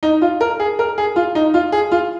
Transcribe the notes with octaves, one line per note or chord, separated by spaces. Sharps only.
D#4
F4
A#4
G#4
A#4
G#4
F4
D#4
F4
G#4
F4